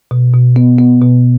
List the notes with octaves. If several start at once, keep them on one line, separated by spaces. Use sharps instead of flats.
B2
B2
B3
B3
B2